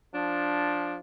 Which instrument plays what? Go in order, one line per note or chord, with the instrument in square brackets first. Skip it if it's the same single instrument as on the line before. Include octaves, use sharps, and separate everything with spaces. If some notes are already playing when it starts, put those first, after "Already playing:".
[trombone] F3 [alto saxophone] D4